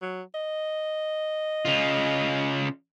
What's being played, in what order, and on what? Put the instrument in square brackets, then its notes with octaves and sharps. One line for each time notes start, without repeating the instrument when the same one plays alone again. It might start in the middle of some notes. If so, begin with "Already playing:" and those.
[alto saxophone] F#3
D#5
[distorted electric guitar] C#3 F4